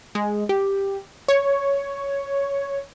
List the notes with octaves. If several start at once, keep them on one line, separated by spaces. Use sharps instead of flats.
G#3
G4
C#5